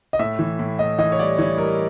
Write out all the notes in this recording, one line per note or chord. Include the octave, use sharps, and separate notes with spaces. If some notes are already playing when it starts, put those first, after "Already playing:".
D#5
A2 E5
E3
A2
A2 D#5
E3 D#5
C#5
G3 D5
E3 C#5
G3 A#4